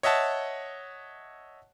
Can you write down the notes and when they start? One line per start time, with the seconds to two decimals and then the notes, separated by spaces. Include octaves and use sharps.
0.03 C#5 D#5 E5 F#5 A5